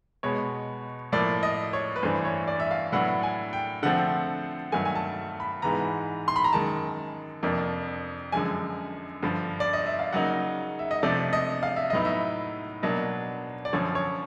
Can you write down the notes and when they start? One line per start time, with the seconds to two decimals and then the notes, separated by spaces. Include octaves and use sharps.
0.23 B2 G#3 B3 C#5
1.12 A2 F3 A#3 D5
1.43 D#5
1.73 C#5
1.96 B4
2.03 G2 E3 A3 D4 C5
2.25 C#5
2.48 D5
2.60 E5
2.71 F5
2.92 A2 F#3 B3 D4 F#5
3.23 G#5
3.53 G5
3.83 D3 F3 A3 C4 F#5
4.72 G2 D#3 F#3 A3 G#5
4.85 G#5
4.95 A5
5.40 B5
5.62 G#2 E3 G#3 B3 A#5
6.28 C6
6.36 B5
6.44 A#5
6.53 F#2 D#3 G#3 A5
7.43 F2 C3 F3 A#3 D4
8.32 F#2 D3 F3 G#3 G#5
9.23 G2 D3 F3
9.60 D5
9.73 D#5
9.86 E5
9.99 F5
10.13 C#3 F#3 A#3 D#4 F#5
10.79 E5
10.91 D#5
11.03 C3 F3 A3 D4 D5
11.33 D#5
11.63 F5
11.76 E5
11.90 A2 F#3 B3 D#4 D#5
12.05 E5
12.82 B2 F#3 A#3 D4 D#5
13.65 D5
13.73 F#2 D3 F3 C#5
13.95 C#5